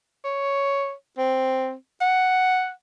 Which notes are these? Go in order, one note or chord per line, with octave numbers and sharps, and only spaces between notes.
C#5
C4
F#5